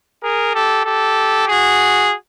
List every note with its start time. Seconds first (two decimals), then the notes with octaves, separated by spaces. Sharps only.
0.23 G#4 A#4
0.54 G4 A4
0.85 G4 A4
1.48 F#4 G#4